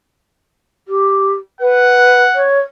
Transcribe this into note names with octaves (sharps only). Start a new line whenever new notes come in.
G4
B4 F#5
C#5